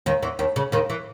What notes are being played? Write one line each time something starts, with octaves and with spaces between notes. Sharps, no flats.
D#2 D#3
E2 E3
D#2 D#3
C#3
D#2 D#3
E3